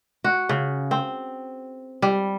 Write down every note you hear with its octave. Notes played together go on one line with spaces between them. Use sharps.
F#4
C#3
C4
G3